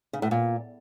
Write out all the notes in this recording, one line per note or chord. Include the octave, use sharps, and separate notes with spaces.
C#3
A2
A#2